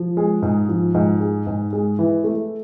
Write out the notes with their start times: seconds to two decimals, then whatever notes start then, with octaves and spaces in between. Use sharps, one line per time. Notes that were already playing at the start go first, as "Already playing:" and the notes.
Already playing: F3
0.17 G#3
0.42 G#2
0.69 F3
0.95 G#2
1.20 G#3
1.47 G#2
1.73 G#3
1.99 E3
2.24 A3